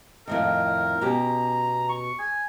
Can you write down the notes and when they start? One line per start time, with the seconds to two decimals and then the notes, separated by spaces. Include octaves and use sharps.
0.28 F2 A2 D#3 A#4
1.01 B2 C#4 G4 A#5
1.89 C#6
2.19 G#5